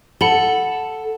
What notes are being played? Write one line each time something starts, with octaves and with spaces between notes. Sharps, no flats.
A4 F#5 B5 G7